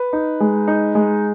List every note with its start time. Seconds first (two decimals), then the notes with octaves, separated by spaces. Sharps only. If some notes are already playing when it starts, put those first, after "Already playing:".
Already playing: B4
0.13 D#4
0.40 G#3
0.68 D#4
0.95 G#3